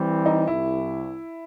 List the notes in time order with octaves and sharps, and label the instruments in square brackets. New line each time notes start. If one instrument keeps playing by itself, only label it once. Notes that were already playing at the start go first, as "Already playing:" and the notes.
Already playing: [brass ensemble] E3 G3 C4
[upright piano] D#4
[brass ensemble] C2 [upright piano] E4